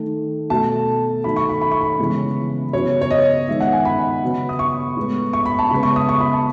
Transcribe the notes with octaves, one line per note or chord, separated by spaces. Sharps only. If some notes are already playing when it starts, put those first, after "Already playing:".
Already playing: D#3 A3
B2 A3 A5
D#3 F#3 A3 B5
C#6
B5
B5
C#6
B5
C#3 E3 G#3 B3
C#3 F#3 B3 C#5
C#5
D#5
D#3 G#3 B3 E5
F#5
G#5
B5
C#3 F#3 B3
D#6
C#6
A2 G#3 B3
C#6
B5
A5
C#3 G#3 B3 B5
C#6
D#6
C#6
B5
A5